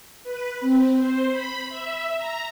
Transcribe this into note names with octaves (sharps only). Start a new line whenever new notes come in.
B4
C4
C5
B5
E5
A#5